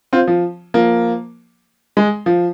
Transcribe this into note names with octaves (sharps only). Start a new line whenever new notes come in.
C4 F4
F3
F3 A#3
G#3
F3